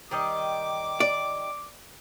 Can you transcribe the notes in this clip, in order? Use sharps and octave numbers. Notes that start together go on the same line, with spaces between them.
D#3 G3 D#5 D6
D5